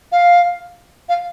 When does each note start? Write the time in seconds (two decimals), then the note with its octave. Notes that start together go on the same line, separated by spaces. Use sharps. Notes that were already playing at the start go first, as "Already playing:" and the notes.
0.12 F5
1.08 F5